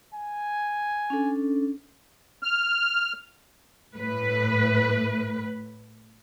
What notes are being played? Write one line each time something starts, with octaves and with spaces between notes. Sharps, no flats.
G#5
C#4 D4 A4
F6
A2 B4